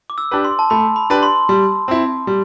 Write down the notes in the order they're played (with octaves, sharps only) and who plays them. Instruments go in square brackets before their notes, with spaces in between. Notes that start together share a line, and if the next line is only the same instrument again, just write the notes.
[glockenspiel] D6
E6
[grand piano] D4 G4 B4
[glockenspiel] C6
A5
[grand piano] A3 [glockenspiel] B5
[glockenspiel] B5
[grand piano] D4 G4 B4
[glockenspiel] C6
[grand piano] G3
C4 E4
G3